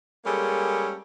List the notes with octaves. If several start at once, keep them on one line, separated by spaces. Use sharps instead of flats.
G3 G#3 A#3 C#4 G#4 A4